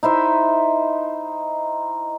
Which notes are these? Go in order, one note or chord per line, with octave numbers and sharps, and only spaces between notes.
D#4 E4 C5 E5